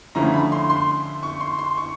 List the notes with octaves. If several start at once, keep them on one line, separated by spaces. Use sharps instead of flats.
D3 F3 A3 C#4 E4 A#5
B5
C6
C6
C#6
C6
C6
C#6